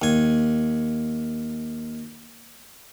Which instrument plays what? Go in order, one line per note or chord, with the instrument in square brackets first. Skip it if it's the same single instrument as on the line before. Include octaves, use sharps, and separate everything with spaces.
[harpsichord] D#2 G#5